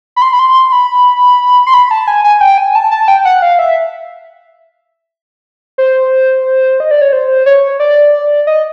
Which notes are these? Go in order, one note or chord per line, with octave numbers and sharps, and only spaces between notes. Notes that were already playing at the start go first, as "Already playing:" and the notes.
B5
C6
B5
C6
B5
C6
B5
A5
G#5
G#5
G5
G#5
A5
A5
G5
F#5
F5
E5
C5
D#5
D5
C#5
C5
C#5
D5
D#5